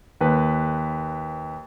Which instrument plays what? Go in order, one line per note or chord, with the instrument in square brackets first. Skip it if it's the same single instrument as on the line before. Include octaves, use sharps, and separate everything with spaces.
[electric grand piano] D#2 B4